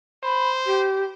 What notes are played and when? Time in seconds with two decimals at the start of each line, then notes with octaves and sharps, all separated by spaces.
0.24 C5 B5
0.66 G4